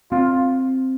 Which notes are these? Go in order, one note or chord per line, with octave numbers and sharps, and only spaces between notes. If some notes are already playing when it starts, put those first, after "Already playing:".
C4 F4